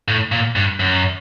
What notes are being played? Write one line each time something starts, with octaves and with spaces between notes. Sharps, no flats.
A2
A#2
G2
F#2